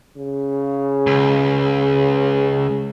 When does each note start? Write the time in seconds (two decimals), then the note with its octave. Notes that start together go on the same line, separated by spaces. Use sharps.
0.16 C#3
1.07 C#2